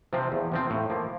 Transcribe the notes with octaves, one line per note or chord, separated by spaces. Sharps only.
C3 F3 C4
E2
C3 F3 C4
A2
F3 A#3